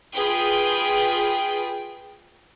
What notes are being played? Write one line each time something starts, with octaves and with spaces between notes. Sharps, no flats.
F4 G#4 B4 G5